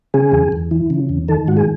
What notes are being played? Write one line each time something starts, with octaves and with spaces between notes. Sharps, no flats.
C#3 G#4
E2
E2
E3
C#3
E2
D#3 A4
G#2 F#4
G#4